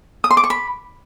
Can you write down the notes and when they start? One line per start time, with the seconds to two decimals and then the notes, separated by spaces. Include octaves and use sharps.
0.24 D#6
0.31 C6
0.37 D6
0.44 C#6
0.50 B5